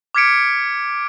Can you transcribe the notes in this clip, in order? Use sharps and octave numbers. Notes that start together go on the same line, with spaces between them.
D6 F6 G#6 B6 C#7 D7